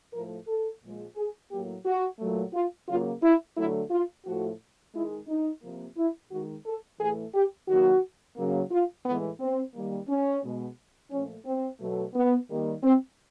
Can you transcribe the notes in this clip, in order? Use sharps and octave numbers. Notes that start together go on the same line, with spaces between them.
A2 F3 A3 A#4
A4
A#2 F3 G#3
G#4
A2 F#3 A#3 G4
F#4
A#2 F#3 A3
F4
C#3 F#3 A#3 F4
E4
D3 F#3 A3 E4
F4
A2 F3 A3 F#4
D#3 G#3 E4
D#4
C3 F3 A#3
E4
D#3 G#3 F#4
A4
A2 E3 A3 G#4
G4
D#3 F#3 A#3 F#4
C#3 F#3 A#3
F4
A2 E3 G#3 B3
C4
D#3 G3 A#3
C#4
B2 G#3
A#2 F3 A3 C#4
C4
B2 F#3 A3
B3
D#3 G3 A#3
C4